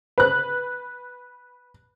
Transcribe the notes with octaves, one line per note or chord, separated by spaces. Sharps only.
B4 F#6